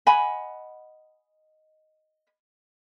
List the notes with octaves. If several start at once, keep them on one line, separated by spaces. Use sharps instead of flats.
D#5 F#5 G#5 B5